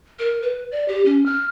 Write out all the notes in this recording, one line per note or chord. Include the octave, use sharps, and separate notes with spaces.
A#4
B4
D5
G4
C#4
F6